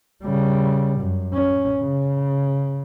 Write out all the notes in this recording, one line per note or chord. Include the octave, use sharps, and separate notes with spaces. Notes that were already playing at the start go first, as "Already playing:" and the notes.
C#3 G3
F#2
C#4
C#3